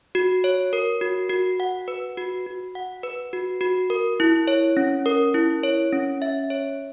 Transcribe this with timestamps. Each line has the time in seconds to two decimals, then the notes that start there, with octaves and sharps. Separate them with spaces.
0.15 F#4
0.44 C#5
0.73 A#4
1.01 F#4
1.30 F#4
1.60 F#5
1.88 B4
2.17 F#4
2.46 F#4
2.75 F#5
3.03 B4
3.33 F#4
3.61 F#4
3.90 A#4
4.20 E4
4.48 C#5
4.77 C#4
5.06 A#4
5.34 E4
5.63 C#5
5.93 C#4
6.22 E5
6.50 C#5